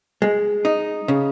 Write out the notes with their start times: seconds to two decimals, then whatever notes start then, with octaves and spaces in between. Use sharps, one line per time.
0.22 G#3
0.65 D#4
1.08 C#3